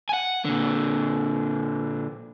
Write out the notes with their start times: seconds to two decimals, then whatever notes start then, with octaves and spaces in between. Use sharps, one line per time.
0.09 F#5 G#5
0.45 A#2 D3